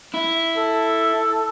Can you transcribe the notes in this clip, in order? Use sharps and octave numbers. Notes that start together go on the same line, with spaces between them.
E4
A4